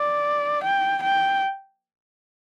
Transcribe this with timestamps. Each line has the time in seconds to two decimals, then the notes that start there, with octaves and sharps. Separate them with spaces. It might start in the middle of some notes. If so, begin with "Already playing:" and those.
Already playing: D5
0.64 G5
1.03 G5